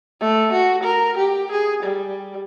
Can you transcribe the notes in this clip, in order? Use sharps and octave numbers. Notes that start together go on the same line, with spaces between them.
A3
F#4
A#4
G4
G#4
G3